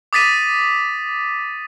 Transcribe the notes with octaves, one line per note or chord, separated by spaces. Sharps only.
D6 D#6 A6 B6 D#7